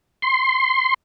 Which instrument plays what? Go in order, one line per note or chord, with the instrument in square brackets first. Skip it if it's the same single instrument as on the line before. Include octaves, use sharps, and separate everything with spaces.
[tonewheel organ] C6